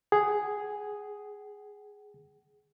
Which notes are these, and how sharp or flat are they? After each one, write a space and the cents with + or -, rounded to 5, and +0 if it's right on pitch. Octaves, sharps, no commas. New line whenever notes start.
G#4 +0 F#5 +40